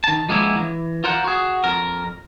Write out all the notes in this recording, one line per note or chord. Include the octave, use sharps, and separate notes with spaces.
D#3 A5
F3 G#3 A#3 B3 C#4 E4
E3
F4 A#4 C5 F#5
F#4 G#4
F2 A#4